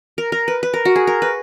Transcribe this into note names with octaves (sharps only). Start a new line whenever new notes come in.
A#4
A#4
B4
B4
A#4
F#4
G#4
A#4
B4